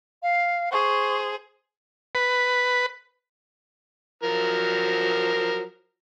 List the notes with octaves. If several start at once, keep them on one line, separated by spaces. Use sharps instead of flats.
F5
G#4 C5 C#6
B4
F3 F#3 A#4